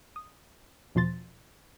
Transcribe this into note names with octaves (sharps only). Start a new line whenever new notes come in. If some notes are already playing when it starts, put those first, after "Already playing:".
D#6
E2 B2 F3 C6 A6